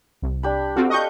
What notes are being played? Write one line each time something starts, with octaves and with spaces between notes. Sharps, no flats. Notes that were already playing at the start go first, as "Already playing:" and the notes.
C2
D4 G4 B5
C4 F4 F#4 A4 F5 G5
G4 B4 D#5 C#6 G6